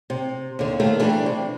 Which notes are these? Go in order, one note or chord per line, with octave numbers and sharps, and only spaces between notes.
C3
D#2 D3
D#3 A3 A#3
E3 G3 A3 D4
C3